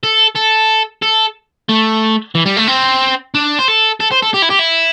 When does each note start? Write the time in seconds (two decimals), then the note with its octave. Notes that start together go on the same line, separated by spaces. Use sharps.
0.04 A4
0.36 A4
1.02 A4
1.69 A3
2.35 E3
2.46 G3
2.57 A3
2.67 C4
3.35 D4
3.59 C5
3.68 A4
4.00 A4
4.11 C5
4.22 A4
4.34 G4
4.42 E4
4.50 G4
4.59 E4